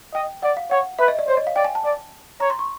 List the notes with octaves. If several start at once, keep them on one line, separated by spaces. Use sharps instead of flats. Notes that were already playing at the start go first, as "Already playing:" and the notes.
D#5 G5
D5 F#5
F5
C#5 F#5
B4 E5
D#5
D5
C5 C#5
D#5
F5
D5 G5
G#5
A5
D5
C#5 A#5
C6
C#6